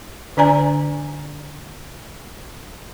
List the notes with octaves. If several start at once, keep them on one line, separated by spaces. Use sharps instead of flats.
D3 D4 D5 G#5 A#5